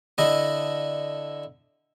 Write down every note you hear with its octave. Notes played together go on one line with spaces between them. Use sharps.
D3 E4 D#5